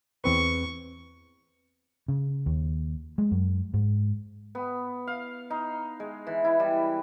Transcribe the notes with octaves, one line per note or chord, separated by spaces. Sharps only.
E2 C4 B4 C#6
C#3
D#2
G#3
F#2
G#2
B3
F5
D#4
G#3
E3
E4
G3